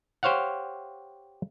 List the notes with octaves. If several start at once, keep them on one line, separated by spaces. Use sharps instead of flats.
G4 C5 C#5 F5 F#5